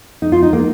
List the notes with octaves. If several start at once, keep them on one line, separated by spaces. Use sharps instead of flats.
D#4
F4
D#4
A#3